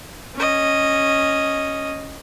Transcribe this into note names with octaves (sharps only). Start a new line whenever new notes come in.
C#4 D#5